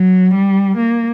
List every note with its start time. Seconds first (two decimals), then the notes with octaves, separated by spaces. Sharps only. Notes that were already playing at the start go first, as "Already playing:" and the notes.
Already playing: F#3
0.34 G3
0.77 A#3